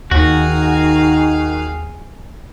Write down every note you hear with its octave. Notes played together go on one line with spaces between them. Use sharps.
D#2 D#3 F#4 G#4 F5